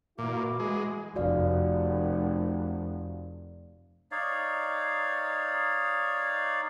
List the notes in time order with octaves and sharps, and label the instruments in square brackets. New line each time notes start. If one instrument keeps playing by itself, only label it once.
[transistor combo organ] A#2 [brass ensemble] E3 E4 F#4 [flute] D6
[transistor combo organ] G#3
[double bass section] F1 [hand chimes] F#4 D5 F5
[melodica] D#4 C#5 D5 F5